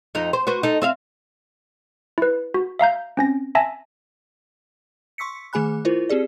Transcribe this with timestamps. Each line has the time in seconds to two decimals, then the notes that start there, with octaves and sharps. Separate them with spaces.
0.15 F2 D#4
0.33 C5
0.47 F#4 B4 C5
0.63 D#4 A4
0.82 C4 E5 F5
2.18 E4 B4
2.54 F#4
2.79 E5 F5 A#5 G6
3.17 C4 C#4 A#6
3.55 E5 G#5 A5 A#6
5.18 C6 C#6 E6 B6 C#7
5.53 D#3 A3 G#4 G#5 B5 F#6
5.85 E4 F4 A#4 C5
6.10 C4 G4 G#4 D5